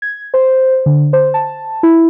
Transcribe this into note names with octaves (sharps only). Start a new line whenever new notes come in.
G#6
C5
D3
C5
A5
E4